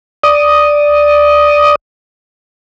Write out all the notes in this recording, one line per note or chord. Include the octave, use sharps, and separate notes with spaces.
D5 D#6